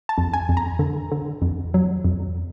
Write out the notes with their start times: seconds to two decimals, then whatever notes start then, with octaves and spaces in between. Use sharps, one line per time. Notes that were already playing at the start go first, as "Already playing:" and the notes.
0.09 A5
0.18 F2
0.33 G#5
0.49 F2
0.57 A#5
0.79 D3
1.12 D3
1.42 F2
1.74 F#3
2.04 F2